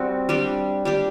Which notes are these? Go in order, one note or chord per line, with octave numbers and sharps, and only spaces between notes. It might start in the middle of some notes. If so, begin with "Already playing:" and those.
Already playing: G3 C4 F#4
G3 D4 G4
G3 D4 G4